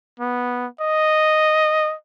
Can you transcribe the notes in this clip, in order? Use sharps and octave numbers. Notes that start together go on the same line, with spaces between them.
B3
D#5